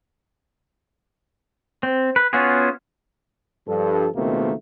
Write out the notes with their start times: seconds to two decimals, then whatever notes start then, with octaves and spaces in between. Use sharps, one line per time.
1.83 C4
2.16 B4
2.33 B3 C#4 F4 F#4 G#4
3.68 G2 F3 A4
4.15 C#2 B2 D#3 A3 A#3 C4